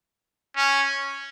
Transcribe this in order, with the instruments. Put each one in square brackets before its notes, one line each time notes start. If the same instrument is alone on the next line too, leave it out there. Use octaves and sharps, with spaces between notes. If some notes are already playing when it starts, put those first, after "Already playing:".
[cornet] C#4